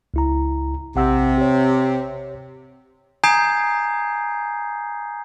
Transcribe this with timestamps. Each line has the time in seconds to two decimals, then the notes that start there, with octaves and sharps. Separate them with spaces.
0.14 C#2 E4 A#5
0.96 A#1 C3 F#5 E6
1.38 G4 C#5
3.24 G#5 A#5 D#6 G6 G#6 C7